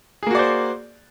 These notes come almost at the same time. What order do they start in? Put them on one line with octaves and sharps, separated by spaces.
G#4 A#3 F#4 D5 C5